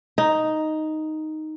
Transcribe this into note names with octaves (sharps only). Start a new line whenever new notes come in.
D#4